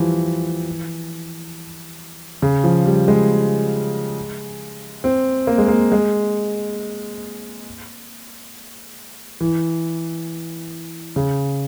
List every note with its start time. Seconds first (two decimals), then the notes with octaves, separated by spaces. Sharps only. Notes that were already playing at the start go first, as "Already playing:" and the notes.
Already playing: E3 F3 G3
2.42 C#3
2.64 F3
2.85 G3
3.08 G#3
5.04 C4
5.47 A#3
5.58 G#3
5.68 A#3
5.92 G#3
9.41 E3
11.16 C#3